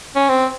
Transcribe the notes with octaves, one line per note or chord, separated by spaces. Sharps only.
C#4
C4